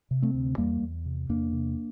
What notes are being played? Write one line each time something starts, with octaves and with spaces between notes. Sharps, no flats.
C3
A3 C4
D2
E2 G3 A#3
E2
C3
E2 A#3 D4
C3